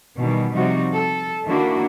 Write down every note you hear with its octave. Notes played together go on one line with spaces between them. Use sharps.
B2 D#3 E3 G3
C3 F3 G3 D#4 F#4
A4
D#3 A#3 D4 E4 F#4